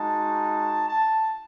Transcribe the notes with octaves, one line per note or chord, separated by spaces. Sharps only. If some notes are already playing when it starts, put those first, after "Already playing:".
Already playing: G#3 D#4 F#4 A5
A5